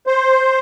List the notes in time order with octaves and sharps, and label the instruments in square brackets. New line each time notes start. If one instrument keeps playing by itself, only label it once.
[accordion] C5